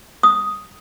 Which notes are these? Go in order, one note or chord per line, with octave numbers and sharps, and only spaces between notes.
D#6